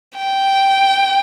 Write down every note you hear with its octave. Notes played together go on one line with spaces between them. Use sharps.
G5